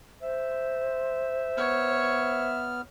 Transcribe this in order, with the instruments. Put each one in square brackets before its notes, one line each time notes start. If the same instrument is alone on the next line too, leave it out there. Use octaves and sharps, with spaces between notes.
[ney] C5 [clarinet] E5
[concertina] B3 F6 [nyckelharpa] C#5